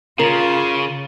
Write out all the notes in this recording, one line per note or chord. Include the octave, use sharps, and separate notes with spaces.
C#3 F4 A#4